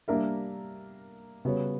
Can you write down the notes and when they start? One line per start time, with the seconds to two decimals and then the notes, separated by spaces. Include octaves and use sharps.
0.08 G3 A#3 D4 A#4 E5
1.45 C#3 G3 B3 F#4 C#5